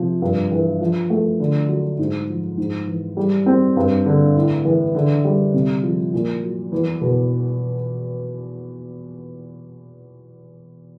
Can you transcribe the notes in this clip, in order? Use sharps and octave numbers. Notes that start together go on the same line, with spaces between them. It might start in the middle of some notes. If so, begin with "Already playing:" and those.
Already playing: C3 F3
G2
E3
F3
A3
D3
F#3
G#2
F3
G#2
E3
G3
C4
G2
D3
A2
E3
D3
G3
C3
F3
A#2
F#3
E2
B2